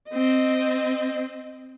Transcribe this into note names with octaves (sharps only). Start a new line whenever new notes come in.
C4 D#5